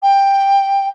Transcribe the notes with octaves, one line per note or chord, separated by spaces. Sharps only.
G5